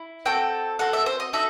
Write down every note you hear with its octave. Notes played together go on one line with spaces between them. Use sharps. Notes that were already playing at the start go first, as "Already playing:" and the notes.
Already playing: E4
C4 F#4 A4 G5
C4 F#4 A4 F#5
E5
C5
D#5
D#4 F#4 A4 E5